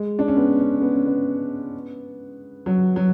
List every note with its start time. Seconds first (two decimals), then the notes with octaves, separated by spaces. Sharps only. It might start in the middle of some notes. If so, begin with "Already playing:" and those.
Already playing: G#3
0.19 D4
0.28 C#4
0.36 B3
0.60 C#4
0.82 B3
0.94 C#4
1.06 B3
2.66 F#3
2.96 F#3